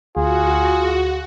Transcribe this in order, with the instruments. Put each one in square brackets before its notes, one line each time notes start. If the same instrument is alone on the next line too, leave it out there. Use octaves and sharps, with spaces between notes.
[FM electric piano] D2 [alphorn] F4 [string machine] F#4 [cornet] G#4